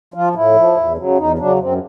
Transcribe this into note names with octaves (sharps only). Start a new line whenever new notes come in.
F3 F4
A2 E4
F3
E2
C#3 F#3
E2 D#4
C#3 F#3 D4
F#2 C4